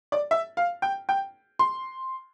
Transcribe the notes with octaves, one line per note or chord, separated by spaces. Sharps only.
D5
E5
F5
G5
G5
C6